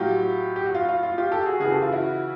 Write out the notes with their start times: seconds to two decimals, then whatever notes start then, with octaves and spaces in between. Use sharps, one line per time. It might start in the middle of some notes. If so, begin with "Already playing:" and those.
Already playing: A2 F#3 F4 G4
0.56 G4
0.65 F#4
0.75 F4
0.89 F4
1.03 F4
1.18 F4 G4
1.32 G4 A4
1.46 F#4 G#4
1.60 C#3 F#4 G#4
1.64 E3
1.71 G4 A4
1.82 F4
1.92 E4 F#4